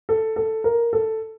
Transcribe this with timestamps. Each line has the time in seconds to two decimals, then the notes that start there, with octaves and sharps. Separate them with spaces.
0.09 A4
0.36 A4
0.64 A#4
0.93 A4